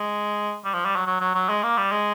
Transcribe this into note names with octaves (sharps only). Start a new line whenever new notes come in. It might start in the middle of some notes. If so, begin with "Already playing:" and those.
Already playing: G#3
G3
F3
G3
F#3
F#3
F#3
F#3
G#3
A#3
G3
G#3